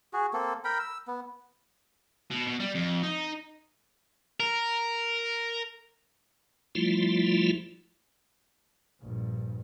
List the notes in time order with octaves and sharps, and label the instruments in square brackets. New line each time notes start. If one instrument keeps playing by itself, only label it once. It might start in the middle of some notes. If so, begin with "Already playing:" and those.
[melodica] F#4 G#4
A#3 C4 A4
A#4 G5 B5
E6
B3
[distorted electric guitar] B2
B2
G3
F2
D#4
A#4
[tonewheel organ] F3 G3 A3 E4 F4
[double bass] A#1 G2